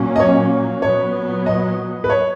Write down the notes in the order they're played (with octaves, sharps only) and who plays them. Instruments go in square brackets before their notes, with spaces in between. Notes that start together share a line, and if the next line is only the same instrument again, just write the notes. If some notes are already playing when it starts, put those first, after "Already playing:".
Already playing: [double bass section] A#2 F#3 A#3 C#4
[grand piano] D#5
C#5
[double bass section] A#2 F#3 B3 [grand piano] C#5
[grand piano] D#5
B4
C#5